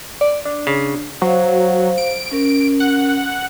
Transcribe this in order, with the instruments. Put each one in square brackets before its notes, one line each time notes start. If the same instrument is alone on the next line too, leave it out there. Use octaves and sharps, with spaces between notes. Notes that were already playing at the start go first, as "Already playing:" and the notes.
[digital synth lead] D5
D4
[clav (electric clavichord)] C#3
[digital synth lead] F#3 [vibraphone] C5 F5
[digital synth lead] D7
[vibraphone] C#4 A#4
[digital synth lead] F#5